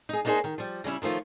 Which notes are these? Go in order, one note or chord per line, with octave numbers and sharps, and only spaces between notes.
D#4 G#4
A#3 D4 D#4 F4 G#4 C5
D#3
F3 G3
C#3 G3 C#4 E4
D#3 F3 A3 F4 C#5